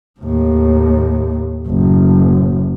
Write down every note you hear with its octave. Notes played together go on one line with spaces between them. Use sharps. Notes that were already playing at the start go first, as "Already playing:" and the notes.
D#2 A2
F#1 A2